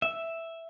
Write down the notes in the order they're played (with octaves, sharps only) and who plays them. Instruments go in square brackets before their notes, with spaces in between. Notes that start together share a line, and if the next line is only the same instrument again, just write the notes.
[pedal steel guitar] E5